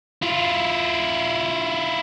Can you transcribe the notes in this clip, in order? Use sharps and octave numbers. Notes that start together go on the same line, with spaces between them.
E4 F4